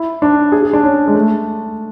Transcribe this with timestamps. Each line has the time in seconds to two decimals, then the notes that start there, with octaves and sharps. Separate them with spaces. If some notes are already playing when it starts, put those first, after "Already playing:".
Already playing: E4
0.22 D4
0.52 G#4
0.63 G#4
0.73 D4
0.83 C#4
1.08 G#3
1.15 A3